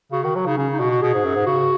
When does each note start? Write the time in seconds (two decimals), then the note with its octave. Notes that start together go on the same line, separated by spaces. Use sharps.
0.12 C#3 F#4
0.23 D#3 F#4
0.35 F#3 F#4
0.46 C#3 D#4
0.57 C#3 C#4
0.73 D#4
0.79 B2 F#4
0.90 F#4
1.02 B2 G#4
1.14 G#2
1.24 F#2
1.35 G#2
1.46 C#3 F#4